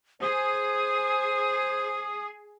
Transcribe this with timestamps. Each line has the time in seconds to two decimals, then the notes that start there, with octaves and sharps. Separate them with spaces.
0.22 G#4 C5 D#6